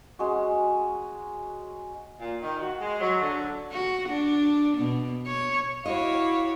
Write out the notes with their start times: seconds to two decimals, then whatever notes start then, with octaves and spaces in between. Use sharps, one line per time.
0.19 G#3 C#4 F#4
2.20 A#2
2.41 D#3
2.60 F#4
2.81 G#3
3.01 F#3
3.21 D3
3.72 F#4
4.09 D4
4.78 B2
5.27 C#5
5.86 E4 F#4 C#5 D#5 F5 D6